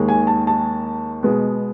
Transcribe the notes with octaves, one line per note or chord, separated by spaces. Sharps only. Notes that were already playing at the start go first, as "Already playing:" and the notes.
Already playing: D#2 D#3 G#3
G#5
A5
A5
B2 G#3 B3